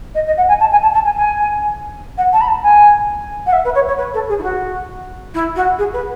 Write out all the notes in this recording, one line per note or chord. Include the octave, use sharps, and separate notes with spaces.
D#5
D#5
F#5
G#5
A5
G#5
A5
A5
G#5
G#5
F#5
A5
B5
A5
G#5
F#5
E5
B4
C#5
C#5
B4
A4
G#4
E4
F#4
E4
F#4
G#4
B4